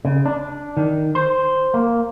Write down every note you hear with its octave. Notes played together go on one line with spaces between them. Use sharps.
C#3
D4
D#3
C5
A#3